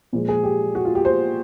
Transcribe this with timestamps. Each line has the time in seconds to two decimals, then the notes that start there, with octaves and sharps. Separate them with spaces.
0.13 A#2 F3 G#3
0.28 G#4
0.44 G4
0.75 F#4
0.85 F4
0.95 G4
1.05 C5